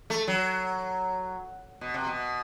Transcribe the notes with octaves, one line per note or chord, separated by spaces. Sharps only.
A3
F#3
B2
C3
B2